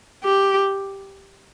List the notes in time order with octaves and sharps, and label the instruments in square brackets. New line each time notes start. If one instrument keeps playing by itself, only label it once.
[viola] G4